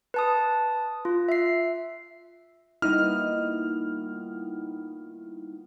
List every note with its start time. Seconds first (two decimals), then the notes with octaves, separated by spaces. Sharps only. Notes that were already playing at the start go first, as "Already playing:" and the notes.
0.14 B4 A5 D#6
1.05 F4
1.29 E5 C7
2.82 A#2 D#3 G3 B3 D#4 E4 F6